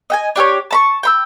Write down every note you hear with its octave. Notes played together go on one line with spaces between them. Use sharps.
D#5 G5 G#5
D4 G4 A4 C#5
A5 B5 C#6
G5 B5 E6